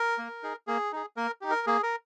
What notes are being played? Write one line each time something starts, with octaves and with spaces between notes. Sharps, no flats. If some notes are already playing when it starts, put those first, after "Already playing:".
Already playing: A#4
A#3
D#4 G#4
A#3 G#4
D#4 G#4
A#3 A#4
D#4 G4
A#4
A#3 G#4
A#4